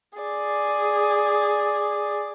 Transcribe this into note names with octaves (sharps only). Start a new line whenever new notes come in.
G#4 D5